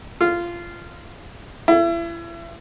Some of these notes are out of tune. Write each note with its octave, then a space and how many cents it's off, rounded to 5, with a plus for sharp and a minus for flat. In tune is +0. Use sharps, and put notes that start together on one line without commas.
F4 -15
E4 +35